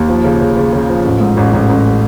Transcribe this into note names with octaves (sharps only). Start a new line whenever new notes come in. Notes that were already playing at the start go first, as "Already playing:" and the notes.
Already playing: D#2
F3
C#3
C#3
C#3
C#3
F3
A1
G#2
A1
A1
A1